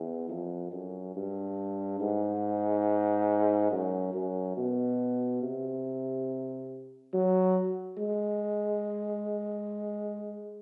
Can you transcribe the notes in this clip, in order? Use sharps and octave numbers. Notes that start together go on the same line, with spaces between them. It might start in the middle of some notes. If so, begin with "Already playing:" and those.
Already playing: E2
F2
F#2
G2
G#2
F#2
F#2
B2
C3
F#3
G#3